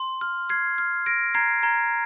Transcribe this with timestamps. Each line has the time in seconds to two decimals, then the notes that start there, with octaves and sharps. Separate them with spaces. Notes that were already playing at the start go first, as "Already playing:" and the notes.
Already playing: C6
0.21 F6
0.50 F6 G#6 C7
0.78 F6
1.06 F6 A#6 D7
1.34 A#5 G#6 C7
1.63 A#5 G#6